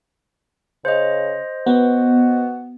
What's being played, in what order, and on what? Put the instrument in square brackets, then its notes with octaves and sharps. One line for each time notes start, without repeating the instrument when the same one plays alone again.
[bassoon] C#3 [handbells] C5 D#5
[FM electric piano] B3 [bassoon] F#4